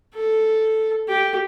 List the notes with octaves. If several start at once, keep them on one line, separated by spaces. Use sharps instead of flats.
A4
G4